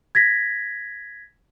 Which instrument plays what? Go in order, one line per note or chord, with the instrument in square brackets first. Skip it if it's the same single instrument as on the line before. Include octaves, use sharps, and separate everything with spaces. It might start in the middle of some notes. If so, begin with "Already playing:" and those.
[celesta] G#6 A#6 B6